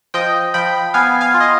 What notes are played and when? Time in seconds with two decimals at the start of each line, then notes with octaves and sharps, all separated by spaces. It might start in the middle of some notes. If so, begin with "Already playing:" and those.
0.14 F3 D#5 G5
0.54 F3 G5 B5
0.94 B3 F5 G#5
1.21 F5 G#5
1.34 F4
1.40 D#5